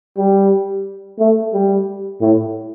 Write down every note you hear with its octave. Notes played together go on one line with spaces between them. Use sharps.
G3
A3
G3
A2